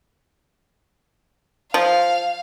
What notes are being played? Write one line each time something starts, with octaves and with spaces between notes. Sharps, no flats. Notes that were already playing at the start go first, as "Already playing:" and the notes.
F3 F5